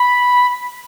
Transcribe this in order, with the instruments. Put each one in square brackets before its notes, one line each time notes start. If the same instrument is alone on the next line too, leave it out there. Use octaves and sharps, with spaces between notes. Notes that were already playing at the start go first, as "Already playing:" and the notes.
Already playing: [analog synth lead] B5